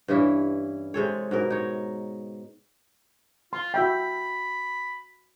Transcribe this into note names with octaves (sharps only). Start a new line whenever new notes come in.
G2 E3 C#4 E4
C3 G#3 A4 C#5
G#2 B2 A#4
D#4 C#5
F4 C6
F#4 E5 G5 B5